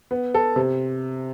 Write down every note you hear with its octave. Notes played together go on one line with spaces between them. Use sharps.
B3
A4
C3